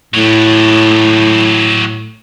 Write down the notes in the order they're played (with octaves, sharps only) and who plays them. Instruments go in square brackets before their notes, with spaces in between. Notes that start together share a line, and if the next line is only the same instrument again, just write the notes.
[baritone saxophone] A2 [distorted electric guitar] F#3 G4